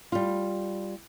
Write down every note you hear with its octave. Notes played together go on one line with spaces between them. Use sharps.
G3 F4